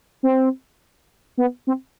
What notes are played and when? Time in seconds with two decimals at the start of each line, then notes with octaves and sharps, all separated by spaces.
0.23 C4
1.38 B3
1.67 C4